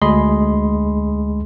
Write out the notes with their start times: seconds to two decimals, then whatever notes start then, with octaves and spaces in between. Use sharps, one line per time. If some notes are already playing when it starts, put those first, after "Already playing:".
0.02 D2 G#3 G#4 D#5 B5 C6